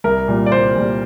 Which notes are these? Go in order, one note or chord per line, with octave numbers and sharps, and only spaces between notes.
C2 A#4
A#2 G3
D5
C2 C5
A#2 G3